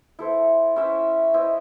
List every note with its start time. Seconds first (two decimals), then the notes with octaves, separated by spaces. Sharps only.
0.19 E4 A4 C5
0.76 C#4 E4 C5 E5
1.34 E4 C5 D#5